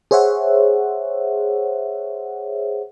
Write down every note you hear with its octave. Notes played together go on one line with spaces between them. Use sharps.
G#4 C5 C#5 E5 F#5